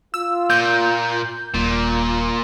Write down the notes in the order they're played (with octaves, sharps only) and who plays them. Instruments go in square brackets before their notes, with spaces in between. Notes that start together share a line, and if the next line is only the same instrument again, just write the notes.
[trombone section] F4 [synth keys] E6
[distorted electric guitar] A#2 [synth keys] G6
[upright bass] D#1 [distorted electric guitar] A#2 [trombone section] A#3